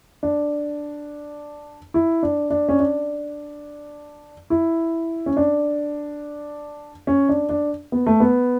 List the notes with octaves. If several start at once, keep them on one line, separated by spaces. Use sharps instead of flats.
D4
E4
D4
D4
C#4
D4
E4
C#4
D4
C#4
D4
D4
B3
A3
B3